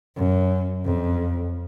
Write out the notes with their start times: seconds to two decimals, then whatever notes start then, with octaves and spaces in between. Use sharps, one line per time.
0.16 F#2
0.85 F2